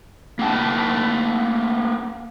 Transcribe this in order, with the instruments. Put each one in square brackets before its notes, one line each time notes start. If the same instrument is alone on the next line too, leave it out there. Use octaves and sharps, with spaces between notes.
[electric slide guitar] A#3 B3 G5 A5